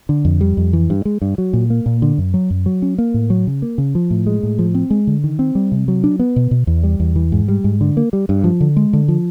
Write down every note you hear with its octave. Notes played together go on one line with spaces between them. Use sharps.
D3
F2
G3
F2
E3
G2
G#3
G2
F#3
A#2
A#3
A#2
D3
F#2
F#3
F#2
F#3
C#4
A#3
A2
F#3
C#3
A#3
C#3
F3
A2
G#3
A2
F3
C4
G#3
D3
D#3
C4
G3
C3
F#3
D4
B3
B2
B2
E2
G3
E2
E3
G#2
G3
G#2
D3
A#3
G3
G2
F3
D3
G#3
D3
F3